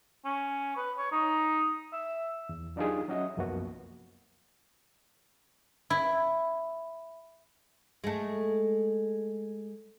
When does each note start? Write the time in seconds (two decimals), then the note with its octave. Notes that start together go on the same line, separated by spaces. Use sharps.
0.25 C#4
0.76 B4
0.97 C#5
1.12 D#4
1.93 E5
2.49 E2
2.76 F#3 D4 D#4 F4 G4 G#4
3.08 F#3 C#4 F#4 D#5 E5
3.37 C2 F#2 F3 A#3 B3 F#4
5.90 E4
8.04 G#3 A3